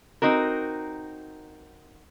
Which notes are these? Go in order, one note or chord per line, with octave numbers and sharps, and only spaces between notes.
C4 D#4 F#4 A#4